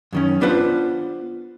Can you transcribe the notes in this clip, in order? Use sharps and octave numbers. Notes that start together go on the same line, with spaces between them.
F#2 D#3 C#4
B3 D4 F4 B4 C5